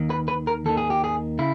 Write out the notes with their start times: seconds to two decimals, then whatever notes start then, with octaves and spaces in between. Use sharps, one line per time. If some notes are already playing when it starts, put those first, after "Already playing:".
Already playing: D#2 D#3
0.10 B4
0.28 B4
0.47 A#4
0.66 D#2 D#3 A4
0.77 G#4
0.90 G4
1.04 G#4
1.39 C#3 E4